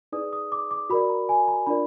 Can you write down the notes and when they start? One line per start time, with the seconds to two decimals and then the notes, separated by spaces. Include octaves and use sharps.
0.12 D#4 G#4 B4 D5 D#6
0.33 D#6
0.52 D6
0.71 D6
0.90 F#4 A#4 D5 B5
1.09 A#5
1.29 G#5
1.48 A#5
1.66 D4 F4 A#4 D5 B5